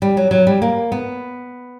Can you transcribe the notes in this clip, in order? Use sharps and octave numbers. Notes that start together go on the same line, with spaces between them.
G3
F#3
F#3
G3
A#3
B3